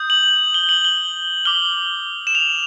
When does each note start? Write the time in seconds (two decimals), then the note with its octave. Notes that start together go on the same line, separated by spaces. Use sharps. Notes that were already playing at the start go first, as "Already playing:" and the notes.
Already playing: D#6 G6
0.10 F#7
0.54 G7
0.69 F#7
0.85 G7
1.45 D6 F6 G7
2.27 E7
2.35 F7